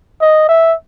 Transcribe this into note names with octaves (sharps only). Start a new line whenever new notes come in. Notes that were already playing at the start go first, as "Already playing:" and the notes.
D#5
E5